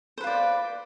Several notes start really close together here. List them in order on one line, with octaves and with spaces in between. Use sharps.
C5 B4 F4 D5